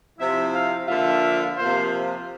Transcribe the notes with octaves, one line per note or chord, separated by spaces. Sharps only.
C3 F3 C4 E4 E5
F5
D3 F3 A#3 F4 E5
C3 F3 A#3 F4 C5